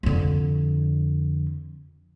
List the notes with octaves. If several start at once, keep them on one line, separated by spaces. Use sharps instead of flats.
F2 D3